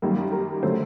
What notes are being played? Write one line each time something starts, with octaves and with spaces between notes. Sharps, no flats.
F#2 D#3 G3 A#3
A#4
D3 F#3 A3 C5